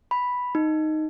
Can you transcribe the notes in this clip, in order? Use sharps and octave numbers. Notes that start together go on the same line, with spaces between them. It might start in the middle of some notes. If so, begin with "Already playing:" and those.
B5
D#4